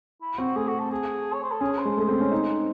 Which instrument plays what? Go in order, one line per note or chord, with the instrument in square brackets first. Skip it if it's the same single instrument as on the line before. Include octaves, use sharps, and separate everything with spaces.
[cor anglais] E4
[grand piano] C4 [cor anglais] F#4
[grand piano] A3 [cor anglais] G#4
[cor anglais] F#4
A4
G#4
C#5
C5
A4
[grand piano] C#4 [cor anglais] G#4
[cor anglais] C5
[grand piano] G#3
A3
C4
C#4
D#4